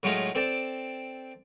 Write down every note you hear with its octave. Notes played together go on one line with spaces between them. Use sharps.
A2 F#3 G#3 A3 D#4 F4
C4 A4 D5 G5 A5